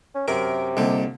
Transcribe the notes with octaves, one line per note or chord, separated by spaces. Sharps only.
C#4
F#2 C3 A#4
C2 A#2 D3 D#4